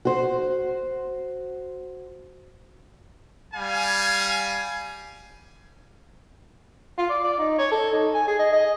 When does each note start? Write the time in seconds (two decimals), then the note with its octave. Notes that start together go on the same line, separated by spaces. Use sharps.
0.05 F#4 C5
3.54 G3 F5 G#5
6.98 F4
7.10 D5
7.24 D5
7.38 D#4
7.59 C#5
7.71 A4
7.93 D#4
8.14 G#5
8.28 G#4
8.39 D#5
8.53 D#5